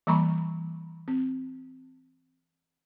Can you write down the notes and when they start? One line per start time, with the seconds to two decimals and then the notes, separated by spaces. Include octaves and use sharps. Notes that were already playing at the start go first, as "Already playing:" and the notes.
0.07 E3 G3 A#3 A#5 B5 C#6
1.08 C4